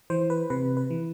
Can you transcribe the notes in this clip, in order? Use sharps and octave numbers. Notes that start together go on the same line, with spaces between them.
E3 C5
B4
C3 B4
B4
E3